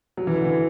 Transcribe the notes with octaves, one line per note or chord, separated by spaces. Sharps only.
F#3
E3
D3
E3